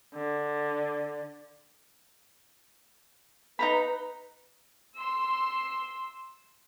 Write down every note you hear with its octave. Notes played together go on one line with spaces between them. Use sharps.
D3
D#4 B4 A#5 B5
C6 E6